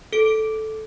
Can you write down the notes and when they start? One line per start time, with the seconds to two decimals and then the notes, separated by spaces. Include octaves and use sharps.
0.13 A4 D7